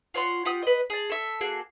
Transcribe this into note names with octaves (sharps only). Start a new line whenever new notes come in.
F4 C#5 F#5 C6
F4 G4 F#5 D#6
B4 D#5
G#4 A5
A4 E5
A#3 F#4 G#4 A4